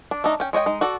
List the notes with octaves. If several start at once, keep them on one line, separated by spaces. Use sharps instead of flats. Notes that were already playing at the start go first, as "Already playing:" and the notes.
D4
A3 D4 D#4
C#4 G5
G#3 C#5 D#5 G5
G#3 D#4
F#4 A4 D5